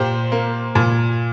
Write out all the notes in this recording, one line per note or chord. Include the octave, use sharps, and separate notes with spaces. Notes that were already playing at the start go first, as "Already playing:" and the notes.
Already playing: A#2 G4 C5
A#3
A#2